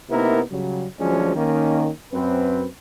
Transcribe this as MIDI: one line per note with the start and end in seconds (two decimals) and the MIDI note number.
0.10 0.40 48
0.10 0.40 58
0.10 0.40 59
0.10 0.40 63
0.10 0.40 64
0.10 0.40 70
0.51 0.86 49
0.51 0.86 54
0.51 0.86 55
1.00 1.34 38
1.00 1.34 53
1.00 1.34 54
1.00 1.34 56
1.00 1.34 61
1.00 1.34 62
1.35 1.90 51
1.35 1.90 58
1.35 1.90 61
2.13 2.65 42
2.13 2.65 60
2.13 2.65 71